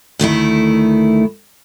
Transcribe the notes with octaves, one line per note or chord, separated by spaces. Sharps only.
D2 D#3 A3 E4